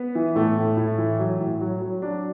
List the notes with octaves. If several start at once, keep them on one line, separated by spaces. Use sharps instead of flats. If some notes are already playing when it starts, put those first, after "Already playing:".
Already playing: B3
E3
A2 A3
A2
A2
E3
F#3
A2
F#3
F#3
F#3 D4